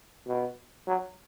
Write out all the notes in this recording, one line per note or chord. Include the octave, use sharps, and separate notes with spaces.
B2
F#3